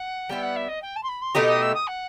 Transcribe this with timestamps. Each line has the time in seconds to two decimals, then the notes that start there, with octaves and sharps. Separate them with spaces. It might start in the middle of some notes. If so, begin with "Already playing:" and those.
Already playing: F#5
0.29 G3 B3 E4 G5
0.42 F#5
0.56 E5
0.68 D#5
0.82 G5
0.96 A5
1.03 C6
1.08 B5
1.21 C6
1.35 B2 A3 D#4 G4 D#6
1.48 D#6
1.62 E6
1.74 D#6
1.87 F#5